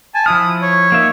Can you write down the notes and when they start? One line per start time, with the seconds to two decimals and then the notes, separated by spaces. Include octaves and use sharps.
0.15 G#5 A5
0.26 F3 E4 D#6 F6
0.62 C#5
0.92 A#3 D#4 E5